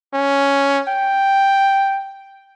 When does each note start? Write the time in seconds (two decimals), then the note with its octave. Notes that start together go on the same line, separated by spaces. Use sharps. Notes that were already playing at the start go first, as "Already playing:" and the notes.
0.14 C#4
0.88 G5